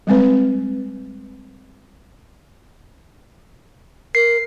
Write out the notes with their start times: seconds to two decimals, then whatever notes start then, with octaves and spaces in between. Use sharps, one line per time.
0.07 G3 G#3 C4 B4
4.15 A#4 C7